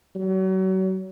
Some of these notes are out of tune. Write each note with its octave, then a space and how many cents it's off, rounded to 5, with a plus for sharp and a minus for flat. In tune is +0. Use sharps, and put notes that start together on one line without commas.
F#3 +35